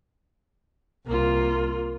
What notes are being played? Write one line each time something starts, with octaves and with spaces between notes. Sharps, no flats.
C2 A#3 F4